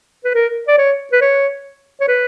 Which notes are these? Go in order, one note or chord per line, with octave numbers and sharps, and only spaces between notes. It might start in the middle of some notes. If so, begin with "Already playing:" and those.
B4
A#4
D5
C#5
B4
C#5
C#5
B4